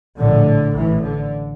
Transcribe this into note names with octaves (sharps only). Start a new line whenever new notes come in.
A#1 A2 D3
A1 A2 E3
D3